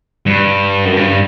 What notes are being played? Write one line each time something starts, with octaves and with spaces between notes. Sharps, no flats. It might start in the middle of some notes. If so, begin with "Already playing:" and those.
G2
F#2
G2